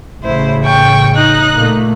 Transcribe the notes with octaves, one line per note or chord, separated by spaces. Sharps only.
A1 C#3 E4 C5
G5 C#6
D#4 F#6
A#2 A3 A#3